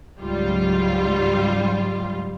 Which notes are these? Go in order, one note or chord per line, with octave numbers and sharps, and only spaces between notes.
C#2 G#2 F#3 G3 F4